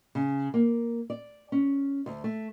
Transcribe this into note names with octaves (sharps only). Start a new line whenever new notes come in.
C#3
A#3
D5
C#4
D2
A3